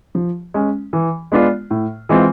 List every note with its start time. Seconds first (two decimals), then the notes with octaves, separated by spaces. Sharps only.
0.15 F3
0.54 G#3 C#4
0.93 E3
1.32 G#3 B3 D4 F4
1.70 A2
2.09 E3 G#3 C4 F4